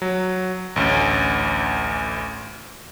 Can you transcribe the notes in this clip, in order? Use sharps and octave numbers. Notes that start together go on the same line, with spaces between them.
F#3
A1 D2 C#4